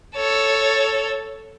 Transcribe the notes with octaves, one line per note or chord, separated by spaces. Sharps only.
A4 C#5